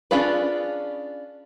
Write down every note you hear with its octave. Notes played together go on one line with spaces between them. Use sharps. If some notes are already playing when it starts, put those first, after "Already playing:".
C#4 D4 F4 G#4 B4